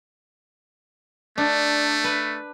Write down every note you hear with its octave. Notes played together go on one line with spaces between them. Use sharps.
A3 D4
B4